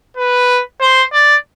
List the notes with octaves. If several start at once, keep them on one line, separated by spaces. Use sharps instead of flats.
B4
C5
D5